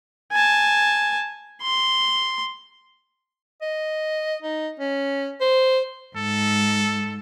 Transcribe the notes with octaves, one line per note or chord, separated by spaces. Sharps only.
G#5 A5
C6
D#5
D#4
C#4
C5
G#2 A4